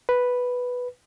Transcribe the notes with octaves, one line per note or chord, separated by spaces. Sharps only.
B4